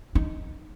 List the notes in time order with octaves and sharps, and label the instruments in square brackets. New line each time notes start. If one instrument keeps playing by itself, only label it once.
[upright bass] D#4